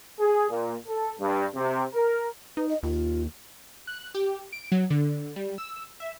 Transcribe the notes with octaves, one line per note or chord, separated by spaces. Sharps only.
G#4
A#2
A4
G2
C3
A#4
D#4 B4
D#5
D#2 F4
F#6
G4
D7
F#3
D3
G3
E6
E5